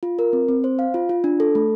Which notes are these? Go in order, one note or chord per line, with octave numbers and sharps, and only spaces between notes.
F4
A#4
C4
C4
C5
F5
F4
F4
D4
A4
A3